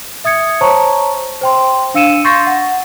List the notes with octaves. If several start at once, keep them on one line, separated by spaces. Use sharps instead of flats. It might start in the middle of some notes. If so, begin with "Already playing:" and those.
E5 D#6 G#6 C#7
C5 C#5 A5 A#5 C#6
C5 G5 C6
D4 F5 E6 C#7 D#7 E7
C6 C#6 G6 A6 A#6 C7
F#5